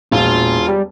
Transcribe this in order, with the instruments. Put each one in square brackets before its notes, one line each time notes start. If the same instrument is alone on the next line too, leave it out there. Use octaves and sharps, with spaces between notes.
[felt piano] E1 [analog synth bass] A#1 [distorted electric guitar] F4
[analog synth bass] G3